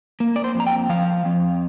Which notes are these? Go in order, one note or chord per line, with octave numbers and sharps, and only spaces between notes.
A#3
D5
C5
F2
A#5
G5
F3 F5
F2